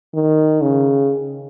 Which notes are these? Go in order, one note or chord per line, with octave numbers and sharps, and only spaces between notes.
D#3
C#3